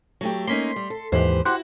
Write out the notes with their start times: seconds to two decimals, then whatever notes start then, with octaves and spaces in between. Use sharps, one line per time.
0.21 F#3 A3 G4
0.47 A#3 C#4 D#4 C6 B6 C7
0.76 G3
0.90 A4
1.12 D#2 G#2 E3 G4 B4 C5
1.45 E4 F#4 G4 C5 F#5